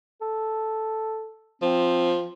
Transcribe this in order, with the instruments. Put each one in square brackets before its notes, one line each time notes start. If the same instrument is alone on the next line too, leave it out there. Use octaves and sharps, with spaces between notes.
[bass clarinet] A4
[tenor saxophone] F3 [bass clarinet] C4